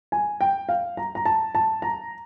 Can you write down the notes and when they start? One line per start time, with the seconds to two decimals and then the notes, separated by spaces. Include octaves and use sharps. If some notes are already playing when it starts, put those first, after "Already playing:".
0.12 G#5
0.41 G5
0.69 F5
0.97 A#5
1.15 A#5
1.25 A5
1.55 A5
1.82 A#5